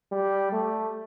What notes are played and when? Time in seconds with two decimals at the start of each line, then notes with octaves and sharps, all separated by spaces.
0.12 G3
0.52 A3